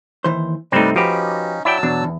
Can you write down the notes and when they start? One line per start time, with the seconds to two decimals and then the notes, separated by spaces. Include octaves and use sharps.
0.24 D#2 E3 C5
0.72 C2 G2 G3 A3 C4 D#4 B4 D5
0.96 F3 C#4 D#4 F#4 G4 B4
1.65 F#3 E4 D5 G5 A5 E6
1.83 E2 B2 D4
2.04 E2